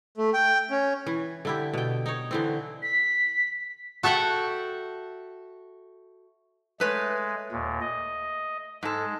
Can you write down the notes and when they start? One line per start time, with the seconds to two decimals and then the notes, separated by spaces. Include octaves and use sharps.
0.18 A3
0.34 G5
0.70 C#4
1.06 E3
1.45 D3 E4 G4
1.73 B2 G5
2.06 D#4 C#5
2.31 D3 E3 C4
2.83 B6
4.03 F#4 A4 E5 F#5 G5
6.80 G#3 A3 B4 C#5
7.52 D#2 A#2
7.81 D#5
8.83 G#2 G#3 A4